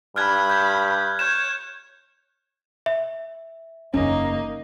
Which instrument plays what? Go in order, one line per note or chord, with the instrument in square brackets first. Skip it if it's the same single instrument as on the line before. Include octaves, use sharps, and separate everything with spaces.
[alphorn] G2 [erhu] B5 [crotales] F6 F#6 G#6
[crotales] G6 G#6
[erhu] C#5 [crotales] G6 G#6 E7
[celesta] E5
[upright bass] F#1 E2 [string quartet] A#3 D#4 [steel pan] C#4